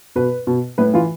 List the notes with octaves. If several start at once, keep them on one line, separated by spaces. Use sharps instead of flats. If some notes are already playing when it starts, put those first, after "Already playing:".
B2 B4
B2
A2 B4
E3 F4